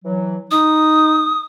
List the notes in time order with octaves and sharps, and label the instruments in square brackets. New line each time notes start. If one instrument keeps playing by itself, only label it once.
[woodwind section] E3 F#3
[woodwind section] D#4 [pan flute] D#6